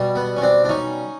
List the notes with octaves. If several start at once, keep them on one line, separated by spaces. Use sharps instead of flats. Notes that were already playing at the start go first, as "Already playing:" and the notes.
Already playing: B2 G3
B3
C#4
C4 D4
D4
C#4 D#4